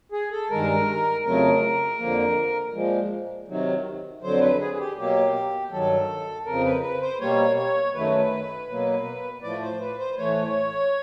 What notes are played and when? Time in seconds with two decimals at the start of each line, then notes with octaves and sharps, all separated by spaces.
0.12 G#4
0.31 A4
0.50 G2 D#3 G#3 A#4
1.24 F2 C#3 F#3 A3 A#4
1.98 F2 D3 F3 A#3
2.74 A#2 F3 G#3
3.48 C3 D#3 F#3
4.22 F2 D3 F#3 C5
4.40 B4
4.60 G#4
4.73 G#4
4.78 G4
4.96 B2 F#3 A#3 G4
5.70 G2 D#3 F#3 A4
6.45 F2 C#3 F3 A#4
6.64 B4
6.82 B4
7.01 C5
7.20 B2 G3 A#3 C#5
7.57 C#5
7.94 F#2 D#3 F#3 A3 B4
8.69 B2 F#3 A#3
9.42 A2 F3 A3 D5
9.61 C5
9.80 B4
9.98 C5
10.18 A2 E3 A3 C#5